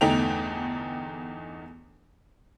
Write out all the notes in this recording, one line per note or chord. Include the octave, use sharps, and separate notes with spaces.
G1 E2 A3 D#4 G5 F7